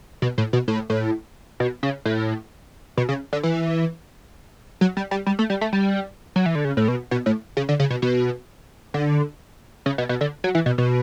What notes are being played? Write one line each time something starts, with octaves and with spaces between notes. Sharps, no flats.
B2
A2
B2
A2
A2
B2
C#3
A2
B2
C#3
D3
E3
F#3
G3
G3
G3
A3
G3
A3
G3
F#3
E3
D3
C#3
A2
B2
B2
A2
C#3
D3
C#3
B2
B2
D3
C#3
B2
B2
D3
F#3
E3
B2
B2